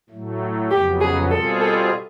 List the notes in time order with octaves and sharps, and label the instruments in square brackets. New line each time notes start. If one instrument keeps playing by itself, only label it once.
[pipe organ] A2 F#3 A3
[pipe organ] F2 C#3 F#3 B3 [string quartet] G4
[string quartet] G#4
[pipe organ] B2 G3 C4 F4 G#4 [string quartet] A4
[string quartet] A4